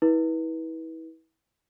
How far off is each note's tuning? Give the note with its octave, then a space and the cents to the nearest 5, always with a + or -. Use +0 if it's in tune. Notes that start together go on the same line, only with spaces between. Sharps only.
E4 -35 B4 -25